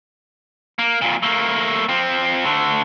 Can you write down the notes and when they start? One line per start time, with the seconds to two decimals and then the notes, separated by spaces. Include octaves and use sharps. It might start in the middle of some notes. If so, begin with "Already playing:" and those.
0.79 A#3
1.02 F2 A#2
1.23 A3 A#3
1.89 F3 C4
2.45 D3 A3